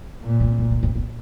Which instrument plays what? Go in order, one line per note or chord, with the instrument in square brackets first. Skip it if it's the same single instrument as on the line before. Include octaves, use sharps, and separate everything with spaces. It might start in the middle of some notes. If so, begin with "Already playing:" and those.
[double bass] A#2
[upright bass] C4
B3
A#3
C4
B3